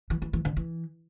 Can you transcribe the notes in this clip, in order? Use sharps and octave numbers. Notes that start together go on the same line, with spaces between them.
E3
E3
E3
D3
E3